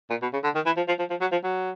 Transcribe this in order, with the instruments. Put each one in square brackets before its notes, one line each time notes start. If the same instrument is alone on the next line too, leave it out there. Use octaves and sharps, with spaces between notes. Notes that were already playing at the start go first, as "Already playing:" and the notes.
[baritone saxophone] A#2
B2
C#3
D3
D#3
E3
F3
F3
F3
F3
F#3
F3
F#3